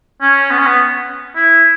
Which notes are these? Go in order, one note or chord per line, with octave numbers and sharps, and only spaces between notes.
C#4
B3
C#4
B3
E4